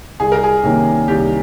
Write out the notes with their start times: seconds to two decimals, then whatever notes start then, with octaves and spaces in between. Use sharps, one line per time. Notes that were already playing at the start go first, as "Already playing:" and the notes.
0.20 C2 G#4
0.32 A#4
0.44 G#4
0.64 C3 D#3 A#3 C#4
1.08 C2 G4